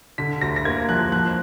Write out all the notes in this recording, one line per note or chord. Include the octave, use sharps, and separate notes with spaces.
D3 B6
D2 A#6
A#6
A#3 G#6
F3 F#6
F3 F#6